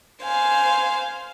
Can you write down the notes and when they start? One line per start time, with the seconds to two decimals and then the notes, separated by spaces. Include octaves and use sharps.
0.22 C5 F5 G#5